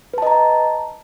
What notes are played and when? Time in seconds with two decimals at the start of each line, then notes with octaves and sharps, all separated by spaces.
0.14 B4
0.18 A5
0.22 D#5
0.27 A#5